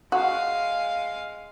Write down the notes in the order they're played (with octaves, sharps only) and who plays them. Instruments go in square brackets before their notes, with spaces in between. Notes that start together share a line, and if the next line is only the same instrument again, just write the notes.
[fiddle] G#3 F5 [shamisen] F#4